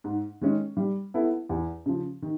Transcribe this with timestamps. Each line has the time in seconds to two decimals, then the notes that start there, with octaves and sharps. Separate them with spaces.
0.04 G#2
0.41 D#3 G#3 C#4
0.77 G3
1.14 B3 E4 A4
1.49 E2
1.86 C#3 F3
2.22 D#3